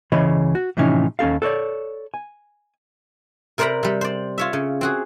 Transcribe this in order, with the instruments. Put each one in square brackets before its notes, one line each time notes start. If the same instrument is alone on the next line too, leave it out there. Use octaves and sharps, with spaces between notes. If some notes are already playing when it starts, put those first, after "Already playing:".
[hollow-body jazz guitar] C#2 C#3 E3 C#5 D#5 B5
F#4
A2 C3 E3 F3 C#4 D#4
D#2 C#4 A4 F5
A4 B4 C#5 D5
G#5
[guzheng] C3 A#4 C5 D5 A#5 B5
C3 G3
C5 D5
F4 C#5 E5
C#3
C4 F#4 G#4